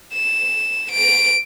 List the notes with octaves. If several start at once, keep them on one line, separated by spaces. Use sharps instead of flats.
E7
D7